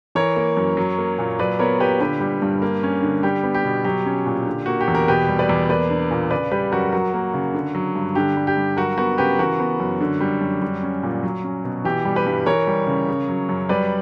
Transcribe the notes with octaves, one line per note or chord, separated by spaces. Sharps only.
E3 A#4 C#5
A#3
F#2
F#3
A#3
A#2
F#3 B4 D5
B3 A#4 C#5
A#2 G4 B4
D3 G4 B4
G3
G2
A#3
C#4
D3
G3 G4
B3
G4
B2
F#3 G4
C#4
A#2
D3
A#3 F#4
G4
E2
A#4
B2 G4 B4
G3
B4 D5
E2
A#3 B4 D5
D4
A#2
C#3 B4 D5
G3 G4 B4
F#2 F#4 A#4
F#3 F#4 A#4
A#3
C#3
D3
F#3
G2
D3 G4
G3
G4
G2
F#3 F#4 A#4
B3 F#4 A#4
C#3 G4 B4
E3 F#4 A#4
B3
F#2
D3
G3
F#2
G3
C#4
A#2
F#3
C#4
B2
E3 G4
G3
G4 B4
G2
E3 A#4 C#5
G3
C#3
C#3
F#3
F#2
G3 B4 D5